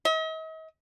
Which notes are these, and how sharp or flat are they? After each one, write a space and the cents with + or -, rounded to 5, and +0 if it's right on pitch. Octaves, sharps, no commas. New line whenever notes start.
D#5 +45